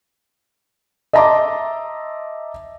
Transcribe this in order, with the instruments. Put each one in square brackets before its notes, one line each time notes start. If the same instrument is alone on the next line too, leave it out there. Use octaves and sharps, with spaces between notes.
[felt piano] D#5 E5 A5 A#5 C6 D6